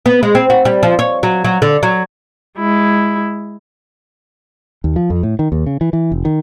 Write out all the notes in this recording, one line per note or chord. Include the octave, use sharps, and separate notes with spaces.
B3
G#3
C4
F#4
G3
F3
C#5
F#3
F#3
D3
F#3
G#3 E4
D#2
F3
F2
A2
D#3
D#2
C#3
E3
E3
F1
D#3